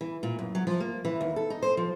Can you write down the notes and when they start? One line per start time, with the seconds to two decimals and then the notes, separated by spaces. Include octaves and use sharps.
0.01 E3
0.23 A#2
0.39 F#2
0.55 F#3
0.67 F3
0.80 A#3
1.05 E3
1.21 D#2
1.36 A4
1.50 D#4
1.62 C5
1.77 F3